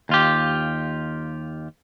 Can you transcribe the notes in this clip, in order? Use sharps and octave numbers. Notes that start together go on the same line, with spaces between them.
D#2 F4 G4